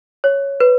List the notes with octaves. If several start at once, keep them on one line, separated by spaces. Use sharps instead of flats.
C#5
B4